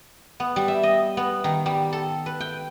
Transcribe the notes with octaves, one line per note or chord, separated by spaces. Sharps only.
B3
G3
E5
D#5
B3
D#3
G3
A4
B4
G5